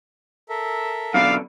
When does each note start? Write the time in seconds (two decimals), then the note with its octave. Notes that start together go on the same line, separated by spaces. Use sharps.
0.49 A4 A#4 E5
1.14 F#2 B2 D3 D5 F5 D6 E6